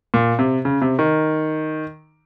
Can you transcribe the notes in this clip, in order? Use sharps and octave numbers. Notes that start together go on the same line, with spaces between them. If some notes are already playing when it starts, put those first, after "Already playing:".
A#2
C3
C#3
C3
D#3